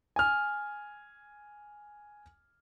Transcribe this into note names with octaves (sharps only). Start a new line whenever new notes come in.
G#5 F6